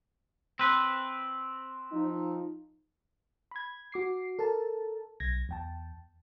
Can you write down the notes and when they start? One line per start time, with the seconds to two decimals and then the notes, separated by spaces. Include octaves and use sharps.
0.59 C4 B4
1.92 F3 D#4
3.51 B5 G#6
3.92 F#4 D6 C7
4.39 A4 A#4 A5
5.20 B1 G#6 A#6
5.49 E2 G5 A5